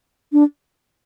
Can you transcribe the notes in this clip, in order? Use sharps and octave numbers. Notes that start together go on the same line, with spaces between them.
D4